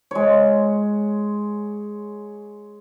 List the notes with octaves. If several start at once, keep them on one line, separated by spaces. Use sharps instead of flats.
G#3 C#5